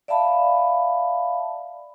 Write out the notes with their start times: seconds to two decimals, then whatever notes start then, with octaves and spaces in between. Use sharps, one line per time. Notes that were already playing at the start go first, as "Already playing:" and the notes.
0.08 D5 E5 F5 A5 B5